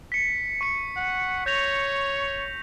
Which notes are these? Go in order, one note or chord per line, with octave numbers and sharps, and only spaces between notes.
B6 C#7
C#6 C#7
F#5
C#5 G6 A#6 F7